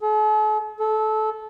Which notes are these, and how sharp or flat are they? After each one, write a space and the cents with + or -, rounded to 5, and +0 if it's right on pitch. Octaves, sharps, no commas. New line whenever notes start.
A4 -45
A4 -20